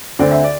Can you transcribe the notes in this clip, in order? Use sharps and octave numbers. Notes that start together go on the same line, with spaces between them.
D2 D3 C4 D5
E5
D5